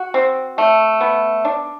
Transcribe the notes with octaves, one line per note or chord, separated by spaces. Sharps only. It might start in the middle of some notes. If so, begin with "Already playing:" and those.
Already playing: F#4
C4
A3
B3
D4